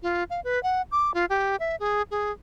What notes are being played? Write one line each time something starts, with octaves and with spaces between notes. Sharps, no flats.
F4
F5
B4
F#5
D6
F4
G4
E5
G#4
G#4